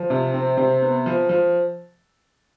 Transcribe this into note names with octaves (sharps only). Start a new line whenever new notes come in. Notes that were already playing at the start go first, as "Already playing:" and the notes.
Already playing: F3
C3
C4
C3
B3
F3
F3